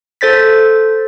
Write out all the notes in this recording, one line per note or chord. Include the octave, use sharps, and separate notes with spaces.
A4 C5 A6 B6